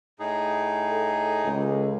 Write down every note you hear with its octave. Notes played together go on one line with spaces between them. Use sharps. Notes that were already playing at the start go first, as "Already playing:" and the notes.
A2 D#4 G#4
A4
C#2